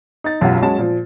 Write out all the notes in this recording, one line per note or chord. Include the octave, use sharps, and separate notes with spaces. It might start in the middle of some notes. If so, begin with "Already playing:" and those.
D#4 A6
E1 B1 F#2 F4 G4 F#5
F#3 G#3 C#4 A5
A#2 F3